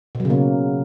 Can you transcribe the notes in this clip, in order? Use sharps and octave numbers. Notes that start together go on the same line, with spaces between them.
B2
F#3
C#3
A#3